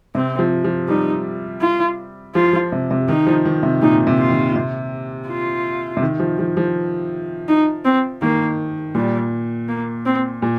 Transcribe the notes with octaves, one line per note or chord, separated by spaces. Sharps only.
C3 C4
F3
F3
G3 D#4
F4
F3 F4
F3
C3
C3
D#3 D#4
F3
D#3
C3
A#2 D#4
C3
F4
D#3
C3
F4
C3
D#3
F3
F3
F3
D#4
C4
D#3 A#3
A#2 G3
A#3
C4
A#2